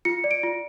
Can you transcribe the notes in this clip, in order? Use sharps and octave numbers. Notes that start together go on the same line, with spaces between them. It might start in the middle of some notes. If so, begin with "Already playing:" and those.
F4 C#7
D5
D7
F4